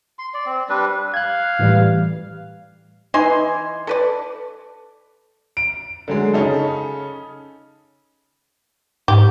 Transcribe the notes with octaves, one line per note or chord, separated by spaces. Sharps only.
C6
D5
C4
G3 D4 B4
F5 F#6 G#6
A2 E3 G3
E3 D#4 G#5 C6
A4 B4 D5
D7
D3 F#3 G#3
C#3 C#4 D#4 A4
G#2 G4